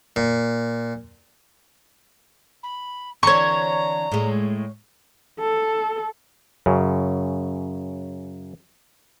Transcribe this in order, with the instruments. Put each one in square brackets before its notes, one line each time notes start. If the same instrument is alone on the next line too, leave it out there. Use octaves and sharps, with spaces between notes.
[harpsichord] A#2
[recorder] B5
[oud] D3 E3 C4 [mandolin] C#5 C#6 [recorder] A#5
[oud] A2 G#3
[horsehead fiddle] A4
[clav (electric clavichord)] F#2 C#3